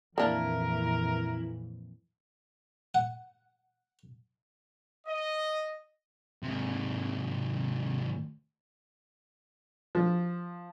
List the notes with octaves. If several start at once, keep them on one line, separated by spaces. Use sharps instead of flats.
F2 A#2 E3 A#3 D4 E4 A#4
F#5
D#5
G#2 C3
F3